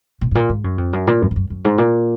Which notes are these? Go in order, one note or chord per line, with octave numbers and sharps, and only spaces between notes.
A#2
G#2
A#2
G#2
F#2
F2
F#2
A#2
F#2
F2
F#2
F#2
G#2
A#2